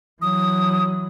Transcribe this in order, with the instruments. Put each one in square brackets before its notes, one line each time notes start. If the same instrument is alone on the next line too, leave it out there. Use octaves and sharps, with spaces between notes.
[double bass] E3 F#3 [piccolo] D#6